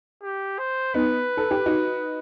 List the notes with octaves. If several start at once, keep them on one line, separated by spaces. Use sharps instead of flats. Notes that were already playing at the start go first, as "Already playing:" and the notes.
G4
C5
B3 D#4 B4
A4
G4
D#4 F#4